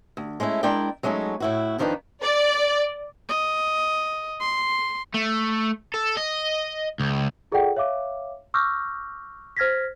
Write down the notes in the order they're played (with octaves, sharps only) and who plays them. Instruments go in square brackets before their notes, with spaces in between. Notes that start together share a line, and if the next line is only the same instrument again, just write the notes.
[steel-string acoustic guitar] D2
G#3 A3 C#4 E4
G#3 D4 E4 A#4 D5 G5
F#3 G#3 A3 C#4 D#4
A2 E4 F#4
F2 D#3 F3 D4 D#4 B4
[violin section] D5
[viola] D#5
C6
[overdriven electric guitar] A3
A4
D#5
C#2
[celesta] F4 G#4 A4 D5 F#5 G5
C#5 E5 F5 D6
C#6 D6 E6 F6 G6 A#6
C5 F6 G#6 A#6 B6